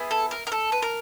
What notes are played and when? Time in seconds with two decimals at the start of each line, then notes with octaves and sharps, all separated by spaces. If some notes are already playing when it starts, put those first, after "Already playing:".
Already playing: B3 E4 G#4
0.11 A4
0.31 A#4
0.47 A#4
0.52 A4
0.72 B4
0.82 A#4